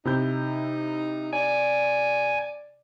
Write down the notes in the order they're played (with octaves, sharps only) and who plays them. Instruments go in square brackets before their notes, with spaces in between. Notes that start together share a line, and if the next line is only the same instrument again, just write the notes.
[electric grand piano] C3 E4 G6 [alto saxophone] D#4
[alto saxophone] D5 [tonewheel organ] G#5